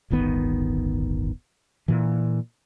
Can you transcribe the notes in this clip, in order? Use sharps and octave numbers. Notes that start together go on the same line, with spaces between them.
D1 G1 D#3 B3
A#2 E3